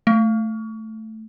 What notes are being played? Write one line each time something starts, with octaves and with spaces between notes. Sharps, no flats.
A3